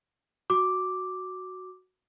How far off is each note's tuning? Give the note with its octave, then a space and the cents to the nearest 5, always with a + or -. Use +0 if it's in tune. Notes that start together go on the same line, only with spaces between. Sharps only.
F#4 +0 D6 +0